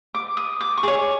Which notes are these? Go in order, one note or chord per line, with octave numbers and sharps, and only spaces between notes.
D6
D#6
D6
C#6
G#4 C#5 D6